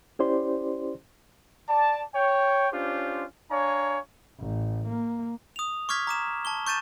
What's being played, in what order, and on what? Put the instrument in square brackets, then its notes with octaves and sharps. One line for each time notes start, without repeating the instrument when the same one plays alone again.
[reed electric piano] C#4 E4 G4 C5 D5 C6
[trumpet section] D5 A5
C#5 G5
C#4 D4 F4 G4 C5
D4 C#5 F5 G#5 A#5
[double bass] A1
A#3
[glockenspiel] D#6 F7
C#6 D6 F6 G#6 B6
A#5 D6 E7
A5 C#6 G7
C#6 G6 A6 D#7 E7